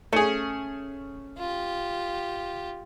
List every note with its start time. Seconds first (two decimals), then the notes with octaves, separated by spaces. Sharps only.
0.13 A3 C#4 G#4
1.38 F4 G4